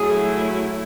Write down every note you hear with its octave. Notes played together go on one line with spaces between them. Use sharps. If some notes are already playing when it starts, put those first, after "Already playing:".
Already playing: F#3 A3 E4 G#4